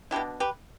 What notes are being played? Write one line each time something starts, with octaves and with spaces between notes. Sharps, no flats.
B2 G3 D4 E4 G4
G4 B4